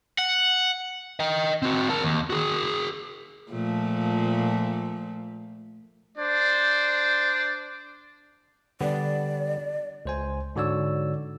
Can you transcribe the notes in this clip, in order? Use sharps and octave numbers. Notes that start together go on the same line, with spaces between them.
F#5
D#5 G5
C4 F#4
A#4 A5
D#2
F#4 G#4
A#2 F3 A3
D4 C5 D5
D3 G3 B3 D5
C#2 C5 G#5
G#2 D3 F#4 C#5 D5 E6